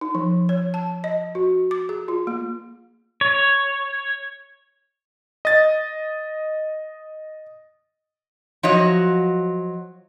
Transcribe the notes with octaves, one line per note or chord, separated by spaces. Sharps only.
D#4
F3
C#5
A5
D#5
F#4
D6
G#4
F4
A#3
C#5
D#5 A6
F3 F#3 F#4 C#5 D#5